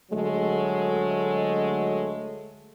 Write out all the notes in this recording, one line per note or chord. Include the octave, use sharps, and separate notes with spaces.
D2 F#3 G#3 A3